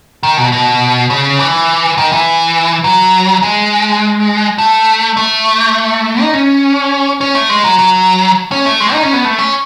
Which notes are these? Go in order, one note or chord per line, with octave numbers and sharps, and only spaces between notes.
D#3
B2
B2
C#3
E3
D#3
E3
F#3
G#3
A3
A3
D#4
C#4
C#4
A3
G#3
F#3
F#3
C#4
A3
G#3
D#4
C#4
B3
A3
C#4